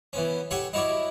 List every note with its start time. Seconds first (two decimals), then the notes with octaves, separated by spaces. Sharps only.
0.13 E3 B3 C#4
0.51 G4 A4 C#5 F#5 G#5
0.73 D#4 E4 F#4 C#5 D5